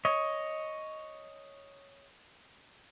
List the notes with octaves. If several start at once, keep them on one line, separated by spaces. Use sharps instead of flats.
C#5 D#5